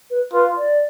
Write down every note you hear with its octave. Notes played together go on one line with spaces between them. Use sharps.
B4
F4 B4
D5